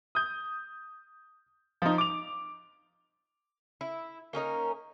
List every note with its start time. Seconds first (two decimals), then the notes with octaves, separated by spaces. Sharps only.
0.15 D#6 G6
1.82 F3 D#4
1.98 D6 F7
3.81 E4
4.33 A#3 C#4 D#4 A#4